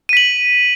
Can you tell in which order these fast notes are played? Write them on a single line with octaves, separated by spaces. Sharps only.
D#7 B6 F#7